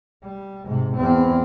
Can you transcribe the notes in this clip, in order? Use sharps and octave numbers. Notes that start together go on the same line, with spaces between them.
G3
G#2 C3
E2 C4